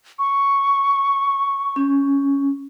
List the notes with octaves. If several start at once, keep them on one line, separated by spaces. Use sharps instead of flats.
C#6
C#4